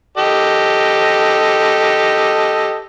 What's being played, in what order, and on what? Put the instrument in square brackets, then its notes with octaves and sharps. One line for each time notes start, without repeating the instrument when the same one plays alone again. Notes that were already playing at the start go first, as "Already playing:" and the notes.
[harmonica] G4 A4 D#5